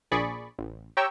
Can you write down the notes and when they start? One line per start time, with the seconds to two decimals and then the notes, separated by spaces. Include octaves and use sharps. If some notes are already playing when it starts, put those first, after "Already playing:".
0.11 A#1 G#4 D5 B5 C#6
0.59 A1
0.97 G4 C#5 G5 A#5 C#6 E6